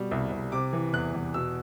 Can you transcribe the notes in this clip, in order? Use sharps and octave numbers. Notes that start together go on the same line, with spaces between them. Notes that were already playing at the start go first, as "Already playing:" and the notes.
Already playing: B2 G3
C2
C2
C3 D6
E3
E2 F#6
E2
B2 E6